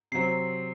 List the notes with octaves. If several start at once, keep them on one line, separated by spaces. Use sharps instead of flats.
C3 F#3 C4 C7